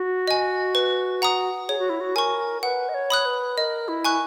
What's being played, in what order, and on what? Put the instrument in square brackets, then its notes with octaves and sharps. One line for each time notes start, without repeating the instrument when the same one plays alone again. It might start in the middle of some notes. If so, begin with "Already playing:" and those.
Already playing: [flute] F#4
[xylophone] D#5 G#5
B4
F#5 A#5 D#6
[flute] G#4 [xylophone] C#5
[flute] F#4
E4
F#4
[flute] A#4 [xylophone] G#5 C#6
[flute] B4 [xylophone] F#5
[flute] D#5
C#5
[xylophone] B5 D#6 F#6
[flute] B4
[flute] A#4 [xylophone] D#5
[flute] E4
[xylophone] G#5 C#6 F#6